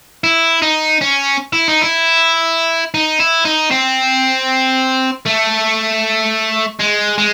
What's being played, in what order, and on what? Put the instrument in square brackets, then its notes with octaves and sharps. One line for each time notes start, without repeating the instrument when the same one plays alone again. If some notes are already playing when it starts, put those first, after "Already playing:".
[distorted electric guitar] E4
D#4
C#4
E4
D#4
E4
D#4
E4
D#4
C4
A3
G#3
G#3